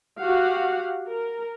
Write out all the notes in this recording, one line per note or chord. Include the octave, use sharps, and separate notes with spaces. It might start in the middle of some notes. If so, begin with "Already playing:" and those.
F#4 G4 F5 F#5
A#4